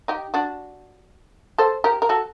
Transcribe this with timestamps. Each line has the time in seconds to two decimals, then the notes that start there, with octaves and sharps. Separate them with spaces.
0.08 D#4 G4
0.34 D4 F#4
1.58 A4 C5
1.84 G4 A#4
2.02 A#4
2.09 F#4 A4